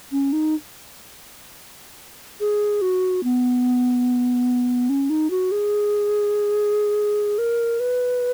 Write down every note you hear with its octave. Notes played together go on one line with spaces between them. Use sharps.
C#4
D#4
G#4
F#4
B3
C#4
D#4
F#4
G#4
A#4
B4